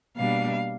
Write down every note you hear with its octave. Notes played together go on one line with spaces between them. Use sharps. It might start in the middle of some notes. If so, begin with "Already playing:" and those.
B2 G3 A#3 D4 F5